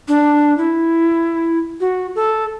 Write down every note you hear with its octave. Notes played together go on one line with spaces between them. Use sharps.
D4
E4
F#4
A4